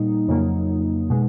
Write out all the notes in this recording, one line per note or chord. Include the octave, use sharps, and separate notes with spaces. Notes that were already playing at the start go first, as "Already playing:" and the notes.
Already playing: A#2 G3 A#3 D#4
F2 C#3 F#3 A#3
B2 G#3